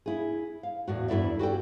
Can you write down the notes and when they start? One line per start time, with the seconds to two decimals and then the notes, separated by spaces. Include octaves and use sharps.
0.06 E4 G#4
0.63 F5
0.88 E2 A2 F#4
1.08 E2 G2 E4 A4 D5 E5
1.39 F#4 G4 A4 G5